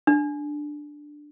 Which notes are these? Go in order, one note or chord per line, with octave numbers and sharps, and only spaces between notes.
D4